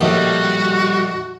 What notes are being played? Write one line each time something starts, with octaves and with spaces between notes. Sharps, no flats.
A#1 D#2 A2 G3 F#4